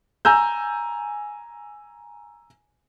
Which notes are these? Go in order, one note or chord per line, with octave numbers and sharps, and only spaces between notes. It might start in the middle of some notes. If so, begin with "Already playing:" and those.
G#5 A#5 E6 G6